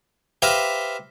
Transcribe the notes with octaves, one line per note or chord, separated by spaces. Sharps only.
G4 B4 C5 E5 F5 A#5